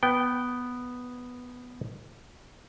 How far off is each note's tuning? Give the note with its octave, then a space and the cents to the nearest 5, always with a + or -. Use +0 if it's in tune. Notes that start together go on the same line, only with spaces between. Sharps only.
B3 +0 G5 -15